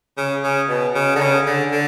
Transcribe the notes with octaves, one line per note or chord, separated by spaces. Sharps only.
C#3
C#3
B2
C#3
D3
C#3
D3
D3